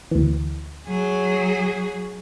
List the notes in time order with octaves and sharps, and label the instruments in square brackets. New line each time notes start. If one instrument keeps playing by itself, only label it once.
[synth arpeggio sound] D2 E3
[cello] F#3 G#4